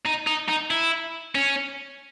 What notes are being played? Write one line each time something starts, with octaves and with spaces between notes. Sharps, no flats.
D#4
D#4
D#4
E4
C#4